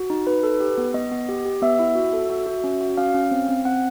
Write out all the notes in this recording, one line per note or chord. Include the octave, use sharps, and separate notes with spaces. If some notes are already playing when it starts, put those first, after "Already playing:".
Already playing: F#4
D#4
D#4 B4
A4
G4
B3
B3 D#5
B3
G4
G4
B3 E5
E4
F#4
A4
F#4
F#4
C#4
F#4
C#4 F5
C#4
C4
C4
C4 F#5